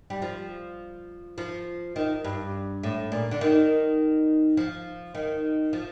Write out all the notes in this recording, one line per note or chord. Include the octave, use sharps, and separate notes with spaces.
G3
F3
F3
D#3
G2
A2
A#2
D3
D#3
F3
D#3
F3